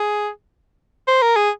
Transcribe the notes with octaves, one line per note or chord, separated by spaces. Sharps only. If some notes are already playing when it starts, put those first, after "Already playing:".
Already playing: G#4
C5
A#4
G#4